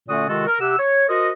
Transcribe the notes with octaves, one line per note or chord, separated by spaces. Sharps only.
A#2 D3 A3 C#4 F#4 D#6
C3 D#3 G#3 F4 F#4 A4
A#4
C3 G4 F#5 E6
C#5
F#4 A#4 C5 D#5